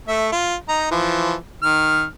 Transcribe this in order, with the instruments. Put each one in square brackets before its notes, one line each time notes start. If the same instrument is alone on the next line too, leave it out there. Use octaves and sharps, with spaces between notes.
[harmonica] A3 E5
F4
D#4 A#5
E3 F3
D#3 F6